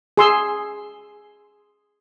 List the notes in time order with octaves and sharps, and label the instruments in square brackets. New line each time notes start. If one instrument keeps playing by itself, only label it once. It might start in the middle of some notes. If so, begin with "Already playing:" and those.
[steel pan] G#4 C6 E6